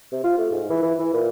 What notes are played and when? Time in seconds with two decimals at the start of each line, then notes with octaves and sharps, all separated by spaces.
0.12 C3
0.24 F4
0.38 A3
0.52 G#2
0.70 E3
0.82 E3
0.99 E3
1.14 A#2